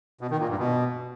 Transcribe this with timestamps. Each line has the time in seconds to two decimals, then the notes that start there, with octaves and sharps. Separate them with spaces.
0.21 B2
0.30 D#3
0.40 A#2
0.49 G2
0.59 B2